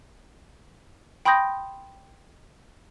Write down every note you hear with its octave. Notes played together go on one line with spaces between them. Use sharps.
G5 B5 C6 D#6 G6 A#6